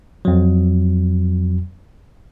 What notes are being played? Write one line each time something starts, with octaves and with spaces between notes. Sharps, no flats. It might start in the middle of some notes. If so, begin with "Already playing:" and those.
F2 F#3